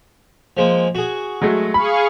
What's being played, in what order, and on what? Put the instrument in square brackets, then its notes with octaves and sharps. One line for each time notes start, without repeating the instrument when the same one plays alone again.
[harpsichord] F3 G#3 A#3
F#4 G#4
[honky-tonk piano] F#3 G#3 A3
[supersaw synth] G#4 F5 C#6 [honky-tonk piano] B5